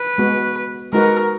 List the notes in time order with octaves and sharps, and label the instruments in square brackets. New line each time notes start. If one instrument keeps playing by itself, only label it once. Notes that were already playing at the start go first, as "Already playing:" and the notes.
Already playing: [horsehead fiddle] B4
[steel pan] G#3 B3 F#4
[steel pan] G#3 D#4 F#4 B4 [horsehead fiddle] A#4